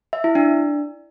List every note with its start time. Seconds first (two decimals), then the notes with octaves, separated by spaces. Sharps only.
0.13 E5
0.24 E4
0.35 D4